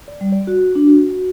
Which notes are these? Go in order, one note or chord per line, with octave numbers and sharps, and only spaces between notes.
D5
G3
D5
F#4
D4
F#4